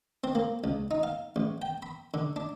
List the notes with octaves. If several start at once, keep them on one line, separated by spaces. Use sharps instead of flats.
C4
A#3
C#2
D#4
F5
A1
G5
B5
D3
D4